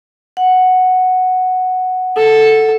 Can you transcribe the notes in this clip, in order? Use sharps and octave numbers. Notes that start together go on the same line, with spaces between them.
F#5
A4